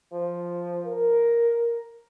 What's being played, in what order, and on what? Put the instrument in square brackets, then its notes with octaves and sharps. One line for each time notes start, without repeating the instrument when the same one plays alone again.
[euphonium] F3
A#4